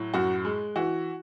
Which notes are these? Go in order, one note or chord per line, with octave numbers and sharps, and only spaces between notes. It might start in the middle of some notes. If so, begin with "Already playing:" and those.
Already playing: A2 F#3
F#2 F#4
G#3
E3 F#4